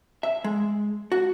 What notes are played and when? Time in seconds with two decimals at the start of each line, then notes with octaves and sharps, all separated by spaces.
0.23 E5
0.44 G#3
1.12 F#4